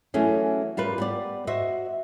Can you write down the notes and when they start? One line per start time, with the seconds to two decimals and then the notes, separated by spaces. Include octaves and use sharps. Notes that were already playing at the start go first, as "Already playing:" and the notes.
0.14 E3 F#3 A3 C#4 G#4
0.77 G3 F4 A#4 B4
0.98 G3 B3 D5
1.47 F#4 C5 D#5 E5